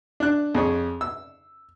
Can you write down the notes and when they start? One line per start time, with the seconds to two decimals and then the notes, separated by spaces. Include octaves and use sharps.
0.20 D4 F#6
0.55 F2 G#4 C#5
1.01 E6